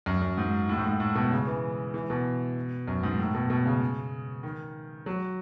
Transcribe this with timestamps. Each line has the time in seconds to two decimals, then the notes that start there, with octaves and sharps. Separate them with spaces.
0.06 F#2
0.22 F#2
0.37 G#2
0.69 A2
0.77 G#2
0.85 A2
1.00 A2
1.15 B2
1.31 C#3
1.47 E3
1.94 E3
2.10 B2
2.88 F#2
3.03 G#2
3.19 A2
3.34 B2
3.50 B2
3.65 C#3
4.43 D#3
5.06 F#3